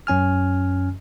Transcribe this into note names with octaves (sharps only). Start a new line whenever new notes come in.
F#2 C#4 G#5 F6